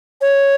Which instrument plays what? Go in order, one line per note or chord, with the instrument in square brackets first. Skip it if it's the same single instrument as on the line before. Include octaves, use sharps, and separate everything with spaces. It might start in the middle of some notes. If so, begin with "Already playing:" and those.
[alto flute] C#5